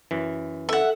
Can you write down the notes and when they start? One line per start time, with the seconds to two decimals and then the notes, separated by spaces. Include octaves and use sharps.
0.11 F#2 E3
0.69 A4 E5 F#5